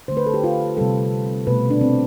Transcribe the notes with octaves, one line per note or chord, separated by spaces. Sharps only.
D3 A3 C5
B4
A4
G4
F4
C3 G3 A4
B2 A3 B4
D4
C4